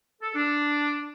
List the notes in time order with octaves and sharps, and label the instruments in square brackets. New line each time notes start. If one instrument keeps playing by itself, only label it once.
[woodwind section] A4
D4